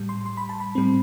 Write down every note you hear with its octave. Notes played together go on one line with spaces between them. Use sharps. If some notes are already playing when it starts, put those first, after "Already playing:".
Already playing: A2 G3
C6
C6
B5
A5
B5
A2 G3 C4